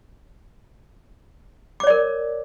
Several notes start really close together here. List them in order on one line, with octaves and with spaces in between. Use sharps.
D6 C#5 D5 A#4